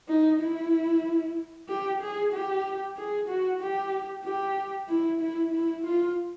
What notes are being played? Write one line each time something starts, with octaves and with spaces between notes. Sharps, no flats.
D#4
E4
G4
G#4
G4
G#4
F#4
G4
G4
E4
E4
E4
F4